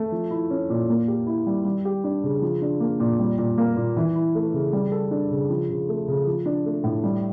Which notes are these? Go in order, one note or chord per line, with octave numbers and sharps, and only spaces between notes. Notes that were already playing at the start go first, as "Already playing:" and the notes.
Already playing: A3
F3
E4
C#4
A#2
A#3
G4
E4
G3
G3
G4
D4
C#3
F3
D4
A#3
A#2
G3
A#2
A#3
A#2
E3
E4
A3
C#3
G3
A4
D4
C#3
F3
C#3
A3
C#3
F3
D4
A3
A2
G3